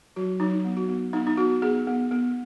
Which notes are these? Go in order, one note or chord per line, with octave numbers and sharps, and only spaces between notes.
F#3 F#4
F#3 D#4
B3
F#4
B3
B3 D#4
D#4
B3 F#4
B3 G#4
B3
B3